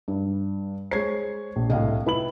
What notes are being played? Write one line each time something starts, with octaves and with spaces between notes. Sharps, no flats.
G2
G#3 C5 C#5 G#6 C7
A#1
C2 A2 D#5 F5
E4 B4 B5 F#7